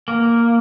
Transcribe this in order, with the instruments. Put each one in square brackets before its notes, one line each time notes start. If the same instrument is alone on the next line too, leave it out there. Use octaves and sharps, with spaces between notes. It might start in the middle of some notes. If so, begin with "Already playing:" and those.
[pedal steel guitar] A#3